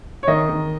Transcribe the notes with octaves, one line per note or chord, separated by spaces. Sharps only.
C#5
D#3 D#5
D#3